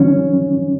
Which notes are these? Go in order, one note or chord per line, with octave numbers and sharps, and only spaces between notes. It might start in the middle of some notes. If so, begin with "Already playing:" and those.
Already playing: D#3 F#3 C#4